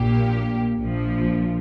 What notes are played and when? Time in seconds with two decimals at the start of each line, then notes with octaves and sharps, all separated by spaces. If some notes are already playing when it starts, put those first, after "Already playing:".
Already playing: A#1 A#2 A#3 G4
0.78 A#1 A#2 F3